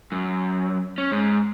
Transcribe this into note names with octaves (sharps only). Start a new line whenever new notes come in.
F#2
C#4
G#2